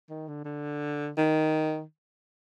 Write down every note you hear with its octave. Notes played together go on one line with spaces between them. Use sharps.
D#3
D3
D3
D#3